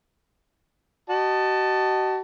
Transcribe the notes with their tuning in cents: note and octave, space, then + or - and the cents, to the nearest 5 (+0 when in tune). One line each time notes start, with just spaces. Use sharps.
F#4 +40 D#5 -20 A5 +5